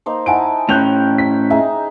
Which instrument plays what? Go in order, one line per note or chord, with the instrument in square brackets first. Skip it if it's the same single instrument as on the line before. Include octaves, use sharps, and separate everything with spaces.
[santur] A#3 D#4 C5
[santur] D#4 E4 A5 [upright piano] F#5 G#5 D7
[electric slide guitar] A2 C#4 [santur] G5 [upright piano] F#6 G6 F7
[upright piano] B6
[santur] D#4 G#4 [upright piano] E5